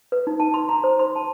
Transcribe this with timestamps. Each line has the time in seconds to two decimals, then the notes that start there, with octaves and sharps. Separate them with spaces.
0.12 B4
0.27 D#4
0.40 A5
0.54 C6
0.69 A#5
0.84 C5
0.99 C6
1.16 A5